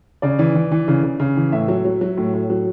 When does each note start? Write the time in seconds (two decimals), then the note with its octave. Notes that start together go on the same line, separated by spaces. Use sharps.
0.22 C#3 D5
0.39 E3
0.56 E3
0.72 E3
0.88 C#3
1.03 C#3
1.20 C#3
1.37 E3
1.52 A2 E5
1.68 F#3
1.85 F#3
2.01 F#3
2.17 A2
2.34 A2
2.50 F#3